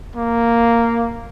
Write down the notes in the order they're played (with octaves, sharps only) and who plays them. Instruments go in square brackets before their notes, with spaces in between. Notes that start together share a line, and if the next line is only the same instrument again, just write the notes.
[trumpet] A#3